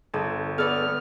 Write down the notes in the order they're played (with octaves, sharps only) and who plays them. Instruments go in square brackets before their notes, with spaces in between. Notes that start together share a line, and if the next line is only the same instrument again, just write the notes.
[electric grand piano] G1 [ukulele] A4
[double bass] B3 [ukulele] A4 D5 [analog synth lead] F6